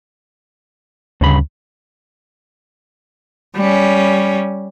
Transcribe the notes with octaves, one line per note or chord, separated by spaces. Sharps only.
D2 G2 C#3 B5
G3 C#4